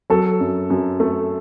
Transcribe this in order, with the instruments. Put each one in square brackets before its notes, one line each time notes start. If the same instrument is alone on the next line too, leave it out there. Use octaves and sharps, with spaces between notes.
[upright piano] F#3 A4
F#2
F#2
A3